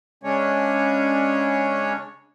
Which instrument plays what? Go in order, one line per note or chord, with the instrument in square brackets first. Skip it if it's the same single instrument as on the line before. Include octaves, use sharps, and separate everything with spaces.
[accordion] C#3 G#3 C#4 D4 C#5